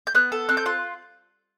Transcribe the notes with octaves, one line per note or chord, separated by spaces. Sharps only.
G6
B3 F#6
A4
C4 F#6
G6
F4 F#6